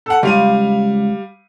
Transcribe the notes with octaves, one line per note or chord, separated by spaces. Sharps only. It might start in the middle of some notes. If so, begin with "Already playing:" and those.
A4 F#5
C#2 G3 F5 D#7